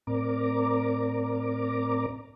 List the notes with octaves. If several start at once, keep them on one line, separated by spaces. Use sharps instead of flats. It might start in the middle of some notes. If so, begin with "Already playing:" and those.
A2 C4 A#4 D5 A#5 D6